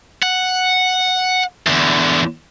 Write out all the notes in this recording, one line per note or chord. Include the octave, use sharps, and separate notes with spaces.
F#5
E2 D3